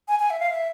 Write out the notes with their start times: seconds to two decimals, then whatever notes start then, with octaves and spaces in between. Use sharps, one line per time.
0.08 G#5
0.19 G#5
0.30 E5
0.40 F5
0.50 E5